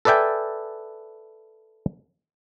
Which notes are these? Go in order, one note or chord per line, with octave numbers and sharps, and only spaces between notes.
A4 B4 D5 E5 G5 G#5